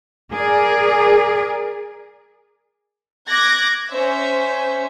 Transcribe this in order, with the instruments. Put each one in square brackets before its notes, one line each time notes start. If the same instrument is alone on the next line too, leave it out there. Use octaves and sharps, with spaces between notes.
[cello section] G#4 A#4 D5
[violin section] D6 F#6 G#6 A#6
C#4 C5 E5